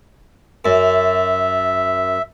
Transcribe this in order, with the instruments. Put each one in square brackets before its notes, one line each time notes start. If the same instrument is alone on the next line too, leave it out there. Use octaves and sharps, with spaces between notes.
[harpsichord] F#2 [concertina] E5